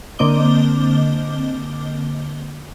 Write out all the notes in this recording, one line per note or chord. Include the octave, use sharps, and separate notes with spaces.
D3 A#3 C4 D#5 D6 G7